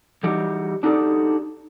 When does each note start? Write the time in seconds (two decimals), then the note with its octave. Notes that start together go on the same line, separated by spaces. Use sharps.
0.23 E3 G3 D#4 F#4 G4
0.83 D4 D#4 F#4 G4 A4 D5